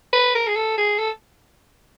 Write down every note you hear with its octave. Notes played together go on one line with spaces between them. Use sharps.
B4
A#4
G#4
A4
G#4
A4